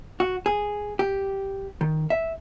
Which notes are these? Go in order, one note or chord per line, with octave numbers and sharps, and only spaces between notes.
F#4
G#4
G4
D#3
E5